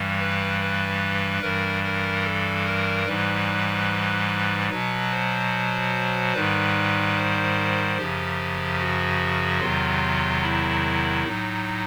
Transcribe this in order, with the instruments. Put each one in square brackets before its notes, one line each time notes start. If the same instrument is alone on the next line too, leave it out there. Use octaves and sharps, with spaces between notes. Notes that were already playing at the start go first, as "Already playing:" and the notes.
Already playing: [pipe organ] G2 E3 G3
B4
B4
G2 E3 G3 A#4
A#4
A4
A#4
G#2 E3 G3 B4
B2 F#3 B4
C5
G#2 D#3 G3 B4
C5
F#2 C#3 F3 G4
F#4
E2 C3 D#3 F#3 F4
E4
A2 F#3 D#4